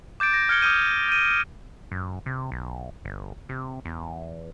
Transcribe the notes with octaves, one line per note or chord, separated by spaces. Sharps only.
D6 G6 A6 D7
A#6
F6 G#6 C#7 G7
D6 D#6 F6 G6 D#7
G6 D#7
F#2
C3
B1
G1
C3
E2